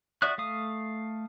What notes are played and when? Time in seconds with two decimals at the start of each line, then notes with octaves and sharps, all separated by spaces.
0.22 F#4 D5 E5 D#6 F#6
0.38 A3 F5 D#6